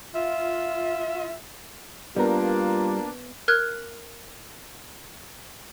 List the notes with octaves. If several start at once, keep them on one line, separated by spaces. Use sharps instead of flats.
F4 E5
G3 A#3 B3 D4 F4 A#4
A#4 F6 F#6 G#6